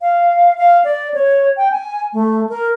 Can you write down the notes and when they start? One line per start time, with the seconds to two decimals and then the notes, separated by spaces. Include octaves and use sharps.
0.01 F5
0.57 F5
0.84 D5
1.14 C#5
1.57 G5
1.72 G#5
2.13 A3
2.49 A#4